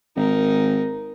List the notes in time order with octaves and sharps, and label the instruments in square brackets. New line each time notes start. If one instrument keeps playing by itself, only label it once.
[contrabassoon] G#1 [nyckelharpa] D#4 A#4